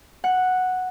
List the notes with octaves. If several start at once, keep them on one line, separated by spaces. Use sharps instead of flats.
F#5